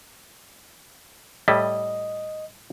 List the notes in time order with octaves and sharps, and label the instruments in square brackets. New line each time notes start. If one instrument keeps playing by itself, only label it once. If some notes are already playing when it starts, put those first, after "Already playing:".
[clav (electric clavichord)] A2 G3 E4 [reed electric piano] D#5